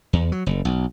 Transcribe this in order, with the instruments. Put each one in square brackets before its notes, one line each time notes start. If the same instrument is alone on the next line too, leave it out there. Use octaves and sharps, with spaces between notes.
[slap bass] E2
F#3
F#1
B1